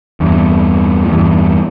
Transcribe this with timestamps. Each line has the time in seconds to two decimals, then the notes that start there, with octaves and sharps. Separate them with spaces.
0.20 E2 G2
1.05 A2
1.11 E2 G2